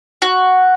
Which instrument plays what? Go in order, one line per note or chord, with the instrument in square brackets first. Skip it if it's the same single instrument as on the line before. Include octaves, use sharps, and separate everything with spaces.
[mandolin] F#4